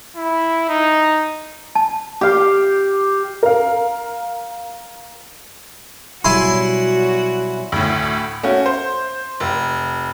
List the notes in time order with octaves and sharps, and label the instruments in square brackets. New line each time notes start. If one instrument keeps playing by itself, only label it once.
[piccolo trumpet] E4
D#4
[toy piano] A5
[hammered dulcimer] G4 F5
[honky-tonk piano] A#4 F5
[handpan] B2 F#3 G3 [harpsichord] E4 G#5 C6 [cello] F#4
[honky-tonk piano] D2 A2
A3 C#4 F#4
C5
F1